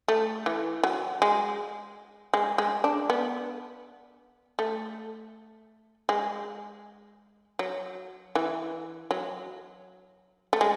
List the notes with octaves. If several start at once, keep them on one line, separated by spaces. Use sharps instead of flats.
A3
E3
F#3
G#3
G#3
G#3
D4
B3
A3
G#3
F#3
E3
F#3
A3
G#3